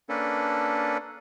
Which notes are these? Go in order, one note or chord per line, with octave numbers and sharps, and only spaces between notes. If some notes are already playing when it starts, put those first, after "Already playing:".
A#3 C#4 D4 A4 B4